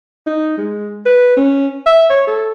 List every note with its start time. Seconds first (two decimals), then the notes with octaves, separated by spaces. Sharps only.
0.27 D#4
0.58 G#3
1.06 B4
1.37 C#4
1.86 E5
2.10 C#5
2.27 A4